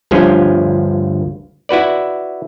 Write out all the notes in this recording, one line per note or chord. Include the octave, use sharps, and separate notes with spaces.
G1 D2 G2 F3 C#4
E4 F#4 B4 D5